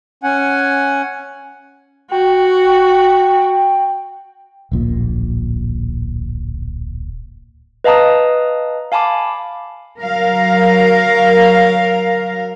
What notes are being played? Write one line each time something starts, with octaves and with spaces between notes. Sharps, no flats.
C#4 F#5 G#5
F#4 G5
D1 A#1 A#2
B4 D#5 F5 A5 A#5 D#6
F5 G#5 A5 B5 D6
F#3 A#4 F5